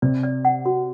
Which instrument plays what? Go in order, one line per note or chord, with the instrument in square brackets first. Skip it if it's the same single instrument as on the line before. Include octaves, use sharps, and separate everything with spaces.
[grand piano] C3 [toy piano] D5
[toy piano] D5
F#5
F#4